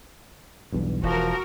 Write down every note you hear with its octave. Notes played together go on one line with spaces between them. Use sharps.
B1 E2 G2
E1 E3 F3 F#4 A#4